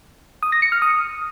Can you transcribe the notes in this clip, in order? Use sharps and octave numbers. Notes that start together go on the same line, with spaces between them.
D#6
A#6
C#7
F6
D#6